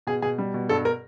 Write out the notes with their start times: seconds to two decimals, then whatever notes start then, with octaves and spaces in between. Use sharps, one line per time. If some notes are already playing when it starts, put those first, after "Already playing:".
0.07 B2 G#4
0.22 B2 G#4
0.38 G3
0.54 B2
0.69 G2 A4
0.85 A#4